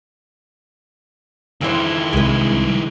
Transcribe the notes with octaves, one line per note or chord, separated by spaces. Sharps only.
F2 D#3 E3 E4 C5
C2 G#3 B4